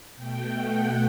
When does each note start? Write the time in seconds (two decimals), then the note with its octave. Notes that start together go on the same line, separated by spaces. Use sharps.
0.16 B2 A3 G5
0.54 F#5